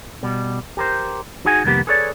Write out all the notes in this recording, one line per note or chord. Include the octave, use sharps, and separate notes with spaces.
B2 G3
G4 A#4 C5
D#4 F#4 G#4 F#5 G#5
C2 F2 D#3 A#3 B3 G4
G#4 A4 B4 C#5 D5